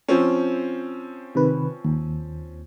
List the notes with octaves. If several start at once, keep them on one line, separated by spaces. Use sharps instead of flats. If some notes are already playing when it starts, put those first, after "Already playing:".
F3 C4 C#4
C3 D#3 B4
D#2